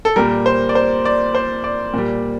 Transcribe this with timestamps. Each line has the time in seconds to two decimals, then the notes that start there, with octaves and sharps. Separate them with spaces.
0.05 A4
0.16 A#2 G3 A#4
0.46 C5
0.69 D5
0.75 C5
1.05 D5
1.35 C5
1.64 D5
1.94 A#2 G3